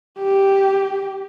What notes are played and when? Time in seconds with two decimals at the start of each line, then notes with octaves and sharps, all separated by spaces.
0.19 G4